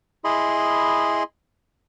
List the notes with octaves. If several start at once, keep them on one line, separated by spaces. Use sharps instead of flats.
E4 G#4 D#5 B5 C6